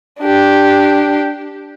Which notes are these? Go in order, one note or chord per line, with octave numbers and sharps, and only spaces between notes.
D4 G4